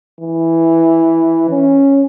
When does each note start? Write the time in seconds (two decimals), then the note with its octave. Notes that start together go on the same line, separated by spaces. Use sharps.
0.20 E3
1.50 C#4